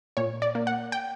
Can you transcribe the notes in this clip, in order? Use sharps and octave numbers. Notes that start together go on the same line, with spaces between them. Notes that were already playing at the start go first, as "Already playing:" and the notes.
A#2 C#5
D5
A#3
F#5
G5